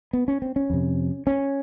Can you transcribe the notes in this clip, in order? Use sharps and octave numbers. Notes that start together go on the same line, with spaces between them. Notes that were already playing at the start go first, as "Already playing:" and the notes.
B3
C#4
C4
C#4
F2 C3
C#4